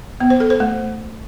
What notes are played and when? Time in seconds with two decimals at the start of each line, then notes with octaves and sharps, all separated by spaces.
0.20 B3
0.30 C5
0.40 A4
0.50 C5
0.60 A3